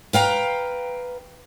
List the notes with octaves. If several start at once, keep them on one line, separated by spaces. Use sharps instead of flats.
B4 F5 G5 A#5